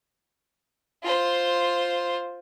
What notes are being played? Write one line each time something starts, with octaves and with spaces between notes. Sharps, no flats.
F4 C5